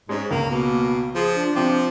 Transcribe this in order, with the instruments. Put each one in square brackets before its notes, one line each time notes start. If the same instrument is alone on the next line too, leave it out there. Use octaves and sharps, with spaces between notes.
[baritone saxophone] G#2 [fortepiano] G#3 C#4
[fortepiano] C#2 C#3 [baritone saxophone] A#3
[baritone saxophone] B2 [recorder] A#3
[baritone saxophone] F3 [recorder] G#4
[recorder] D4
[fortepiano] C3 G5 D6 [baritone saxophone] F3